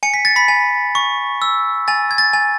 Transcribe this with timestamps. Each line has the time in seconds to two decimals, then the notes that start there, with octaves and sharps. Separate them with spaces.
0.03 G#5 C#7
0.14 B6
0.25 A6
0.36 B5 B6
0.48 G#5
0.95 C#6
1.42 E6
1.88 G#5 A6
2.11 G#6
2.18 A6
2.33 G#5